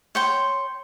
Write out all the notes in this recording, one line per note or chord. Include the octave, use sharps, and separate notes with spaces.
C#5 G5 C6